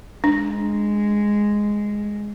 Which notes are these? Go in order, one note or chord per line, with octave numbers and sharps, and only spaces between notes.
G#3 D4